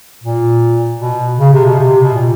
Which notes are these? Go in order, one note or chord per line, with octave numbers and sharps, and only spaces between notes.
A#2
B2
C#3
C3
B2
C3
B2
A#2